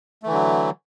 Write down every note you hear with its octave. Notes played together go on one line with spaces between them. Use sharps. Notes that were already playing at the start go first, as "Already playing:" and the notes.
D3 E3 F#3 A3